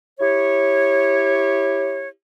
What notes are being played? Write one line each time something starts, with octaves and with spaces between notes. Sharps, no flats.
E4 G4 C#5